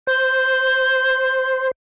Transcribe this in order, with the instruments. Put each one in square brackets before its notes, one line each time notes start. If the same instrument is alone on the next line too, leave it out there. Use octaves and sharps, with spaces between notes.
[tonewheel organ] C5 [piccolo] G6